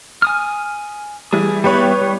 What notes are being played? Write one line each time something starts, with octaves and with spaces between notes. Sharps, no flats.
G#5 D#6 F6
E3 G3 G#4
G3 B3 E4 G4 B4 C#5
G3